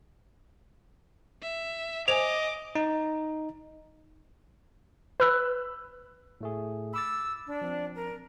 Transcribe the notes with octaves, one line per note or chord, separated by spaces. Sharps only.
E5
C5 D#5 G#5 D6 F7
D#4
B4 E6 F#6
A2 A3 G#4
B5 D6 E6 A6
D4
F3 C4
A#4